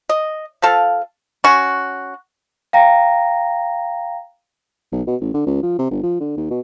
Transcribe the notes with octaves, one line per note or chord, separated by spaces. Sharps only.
D#5
F3 C4 A4 F5
C#4 F#4
F5 G5 A#5 A#6
B1
B2
A1
D3
C#2
F3
C3
G1
F3
D3
D#2
B2